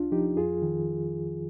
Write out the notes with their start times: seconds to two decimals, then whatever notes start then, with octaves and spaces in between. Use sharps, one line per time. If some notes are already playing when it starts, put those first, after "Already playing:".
Already playing: C2 D4 F4
0.11 F3 D#4 G4
0.37 F2 F4 G#4
0.62 D#3